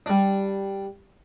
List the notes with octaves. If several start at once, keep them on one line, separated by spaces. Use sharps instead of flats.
G3 D4